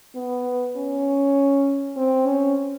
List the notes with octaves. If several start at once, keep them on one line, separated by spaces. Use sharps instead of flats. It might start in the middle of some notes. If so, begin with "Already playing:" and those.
B3
C#4
C4
C#4